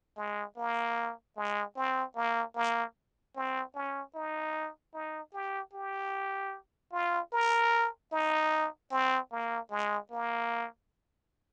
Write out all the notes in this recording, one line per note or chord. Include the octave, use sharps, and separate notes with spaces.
G#3
A#3
G#3
C4
A#3
A#3
C4
C#4
D#4
D#4
G4
G4
F4
A#4
D#4
C4
A#3
G#3
A#3